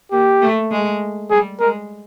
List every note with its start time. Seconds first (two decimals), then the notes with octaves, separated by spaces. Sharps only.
0.12 A#3 G4
0.42 A3
0.71 G#3
1.31 G3 G#4
1.60 G#3 A#4